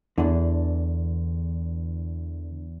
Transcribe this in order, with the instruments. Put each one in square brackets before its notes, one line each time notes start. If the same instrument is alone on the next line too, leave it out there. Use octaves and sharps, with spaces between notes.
[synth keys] E2 [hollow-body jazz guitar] D3 E3 D4